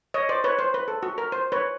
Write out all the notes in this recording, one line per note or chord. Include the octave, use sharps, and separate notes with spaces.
C#5 D#5
C5 D5
B4 C#5
C5
B4
A4
F#4
A#4
C5
B4 C#5